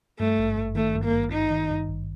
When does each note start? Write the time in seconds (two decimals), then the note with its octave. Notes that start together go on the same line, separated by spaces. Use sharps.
0.19 G2 A3
0.38 G#1
0.57 G#1
0.75 D#3 A3
0.95 G2
1.04 A#3
1.13 G#1
1.32 G#1 D#4
1.51 D#3
1.70 G2
1.88 G#1